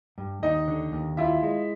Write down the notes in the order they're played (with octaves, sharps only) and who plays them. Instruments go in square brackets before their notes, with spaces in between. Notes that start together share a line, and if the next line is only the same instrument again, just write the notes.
[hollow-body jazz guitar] G2
[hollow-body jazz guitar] D#2 [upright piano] D#4 D#5
[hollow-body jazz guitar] D3
D#2
[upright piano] E4 E5 [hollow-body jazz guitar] F4
[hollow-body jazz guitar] G#3